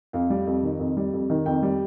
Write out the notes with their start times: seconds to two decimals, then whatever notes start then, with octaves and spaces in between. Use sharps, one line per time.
0.13 F2 F5
0.30 G3
0.47 F2
0.63 D#3
0.79 F2
0.97 G3
1.13 F2
1.30 D#3
1.46 F2 G5
1.62 G3